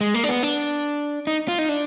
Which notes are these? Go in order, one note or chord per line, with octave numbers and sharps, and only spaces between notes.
G#3
A#3
D4
B3
D4
D#4
F4
D#4
D4